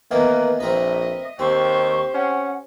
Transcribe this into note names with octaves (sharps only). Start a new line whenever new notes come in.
D#3 E3 A#3 B3 B4
A#1 C4 A#4 B4 D#5 E5
D#2 C4 G4 C5 C#6
C#4 F#5